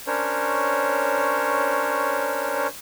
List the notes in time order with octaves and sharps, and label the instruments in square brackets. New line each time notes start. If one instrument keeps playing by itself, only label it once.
[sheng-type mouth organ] C#4 D4 A#4 C5 C#5